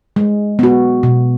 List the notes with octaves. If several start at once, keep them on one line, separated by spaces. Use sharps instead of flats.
G#3
B3 F#4
B2